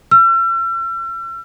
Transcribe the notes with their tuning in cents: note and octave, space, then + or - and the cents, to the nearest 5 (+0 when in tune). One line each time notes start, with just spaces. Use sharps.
E6 +45